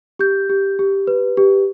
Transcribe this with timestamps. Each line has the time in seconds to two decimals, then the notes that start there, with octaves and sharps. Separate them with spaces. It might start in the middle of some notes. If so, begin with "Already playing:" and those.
0.19 G4 G6
0.49 G4
0.79 G4
1.07 B4
1.37 G4